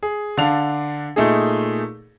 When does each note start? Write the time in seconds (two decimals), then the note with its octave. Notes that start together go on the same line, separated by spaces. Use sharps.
0.03 G#4
0.38 D3 D4 F5 F7
1.16 A#2 A3 D#4 G#4